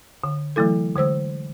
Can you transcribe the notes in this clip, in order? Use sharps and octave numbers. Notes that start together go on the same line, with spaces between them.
D3
E3 F#3 A3 E4 A4
D3 G#3 C5 E6